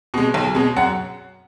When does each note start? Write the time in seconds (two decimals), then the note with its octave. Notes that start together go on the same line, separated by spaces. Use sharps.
0.14 B2 G#3
0.34 B1
0.55 B2 G#3
0.77 F#2 F#5